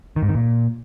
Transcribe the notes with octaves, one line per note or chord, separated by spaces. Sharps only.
D#3
G#2
D#3
A#2